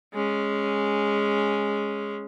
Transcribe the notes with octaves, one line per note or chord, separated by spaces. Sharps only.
G#3 C#4